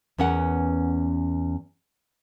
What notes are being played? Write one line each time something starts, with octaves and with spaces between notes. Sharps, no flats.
E2 B3 C#4 A#4 F#5